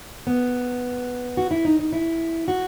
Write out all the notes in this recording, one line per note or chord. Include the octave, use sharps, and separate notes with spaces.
B3
F#4
E4
D#4
D#4
E4
F#4